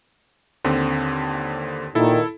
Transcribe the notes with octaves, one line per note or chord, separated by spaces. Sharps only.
D#2 D3 C4
A#2 D#3 E4 A4